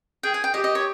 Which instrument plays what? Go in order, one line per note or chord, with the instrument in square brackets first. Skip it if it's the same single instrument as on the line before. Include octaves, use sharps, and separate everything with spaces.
[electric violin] G#4 [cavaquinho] G5
[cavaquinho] G#5
G5
[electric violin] G4 [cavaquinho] D#5
[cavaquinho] D#5
C#5